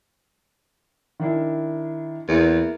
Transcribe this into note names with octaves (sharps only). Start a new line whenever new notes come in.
D#3 D4 E4
E2 A#3 E4